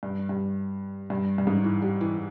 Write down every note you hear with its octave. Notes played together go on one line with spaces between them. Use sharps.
G2
G2
G2
G2
G#2
E3
G3
E3